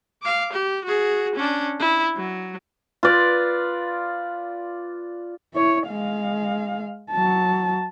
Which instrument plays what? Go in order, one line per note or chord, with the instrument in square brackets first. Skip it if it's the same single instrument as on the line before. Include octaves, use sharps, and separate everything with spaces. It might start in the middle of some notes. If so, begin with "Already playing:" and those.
[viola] F5 D6
G4
F#4 G#4
C#4 D4
E4
F#3
[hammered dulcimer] F4 B4 D5
[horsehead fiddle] E4 C#5
G#3 F5
F#3 A5